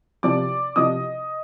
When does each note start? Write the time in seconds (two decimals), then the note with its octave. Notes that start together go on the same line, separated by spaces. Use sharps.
0.23 C3 F3 D5 D6
0.76 C3 F3 D#5 D#6